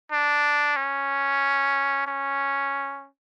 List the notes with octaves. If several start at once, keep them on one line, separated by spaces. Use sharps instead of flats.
D4
C#4
C#4